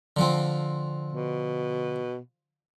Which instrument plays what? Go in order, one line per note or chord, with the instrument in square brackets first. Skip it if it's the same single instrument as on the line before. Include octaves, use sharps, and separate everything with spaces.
[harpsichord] D3 F3 C4
[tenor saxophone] B2